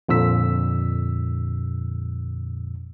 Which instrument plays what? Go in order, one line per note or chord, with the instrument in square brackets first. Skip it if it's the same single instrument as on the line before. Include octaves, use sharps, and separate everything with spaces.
[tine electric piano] F2 A#2 D3 E6 B6